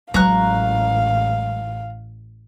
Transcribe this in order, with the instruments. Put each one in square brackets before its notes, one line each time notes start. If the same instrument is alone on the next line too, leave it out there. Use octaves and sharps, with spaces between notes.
[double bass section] A1 [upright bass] F#3 G#3 [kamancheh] F5 [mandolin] A#5 C#6 F#6